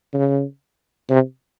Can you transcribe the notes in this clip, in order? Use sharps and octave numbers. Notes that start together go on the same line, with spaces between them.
C#3
C3